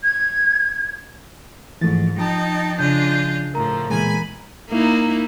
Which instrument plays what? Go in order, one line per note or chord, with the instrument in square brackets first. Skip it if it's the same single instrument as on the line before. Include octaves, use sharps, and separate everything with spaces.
[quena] G#6
[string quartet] G#2 [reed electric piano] E3 F3 A3 [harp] A6
[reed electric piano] F3 [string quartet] D#4 G5 A5 [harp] A#5 D#6
[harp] C#3 D7 [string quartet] D4 F4 D#5 [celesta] D5 G6
[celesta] G6
[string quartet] A2 F3 [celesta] A#4 A#5
[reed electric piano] A#2 G#3 [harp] E3 B3 C4 [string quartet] G#5 B5
[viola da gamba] A#3 D#4 E4